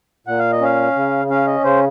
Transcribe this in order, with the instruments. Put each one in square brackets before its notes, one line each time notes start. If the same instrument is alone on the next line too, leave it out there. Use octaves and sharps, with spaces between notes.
[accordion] A#2 F#5
F5
D#5
C#4 F5
C#3
C#4 F5
D#5
C#3 C5